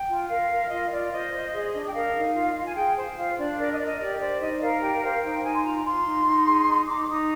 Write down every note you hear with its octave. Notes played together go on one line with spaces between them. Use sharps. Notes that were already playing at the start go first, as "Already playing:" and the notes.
Already playing: G5
F4
A#4 F5
A#4
F4 D#5
F4 D5
C5 D#5
C5
G#4
D4
G5
A#4 F5
D#4
F4
F4
G#5
G#4 G5
C5
G5
F4 F5
D4 D5
A#4 D5
D#5
A#4 D5
D#5
G4 D5
C5 D5
D#4 D#5
A#4 F5
G4 G5
C5 F5
D#4 G5
D#4 G#5
C6
F4 A#5
F4 C6
D#4
D#4
G#4
D#4
D#4 D6
D6
D#4 D#6